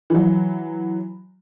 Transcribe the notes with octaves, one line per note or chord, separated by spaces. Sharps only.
E3 F#3